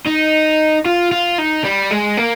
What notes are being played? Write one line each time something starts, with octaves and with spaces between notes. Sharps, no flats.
D#4
F4
F4
D#4
G3
G#3
A#3